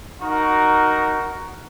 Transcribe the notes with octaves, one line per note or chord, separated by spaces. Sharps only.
D#4 F#4 A#4